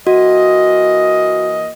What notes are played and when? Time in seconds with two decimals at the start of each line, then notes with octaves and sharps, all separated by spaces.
0.07 E3 A#3 F#4 D#5